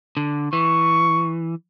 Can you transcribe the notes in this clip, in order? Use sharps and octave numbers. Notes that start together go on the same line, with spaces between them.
D3
E3 C#6